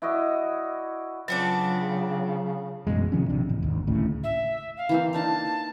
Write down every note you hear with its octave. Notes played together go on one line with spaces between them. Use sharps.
E4 F#4 D5 D#5
C#3 F#3 B3 C4 D4 F4 C#5
A1 F#2 B2 G#3
C3 D#3 F3 C#4
A#1 C3 D4
A1
G#1 D#2
D2 A2 C#3
E5
F5
E3 A#3 C4
D4 D#4 F5 A5